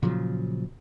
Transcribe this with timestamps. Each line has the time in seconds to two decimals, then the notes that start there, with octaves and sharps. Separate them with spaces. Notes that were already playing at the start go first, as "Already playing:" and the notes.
0.03 A#2 C#3 F3 F#3